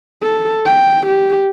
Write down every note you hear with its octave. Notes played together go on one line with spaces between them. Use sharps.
A4
G5
G4